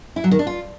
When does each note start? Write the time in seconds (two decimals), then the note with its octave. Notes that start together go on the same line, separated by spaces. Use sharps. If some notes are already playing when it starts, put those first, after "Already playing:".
0.16 E4
0.24 F#3
0.31 D#3
0.39 D4
0.47 F4